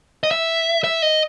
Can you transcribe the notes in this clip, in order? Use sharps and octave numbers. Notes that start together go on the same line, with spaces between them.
D#5
E5
E5
D#5